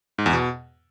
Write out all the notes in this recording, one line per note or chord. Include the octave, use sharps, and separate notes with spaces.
G#2
E2
B2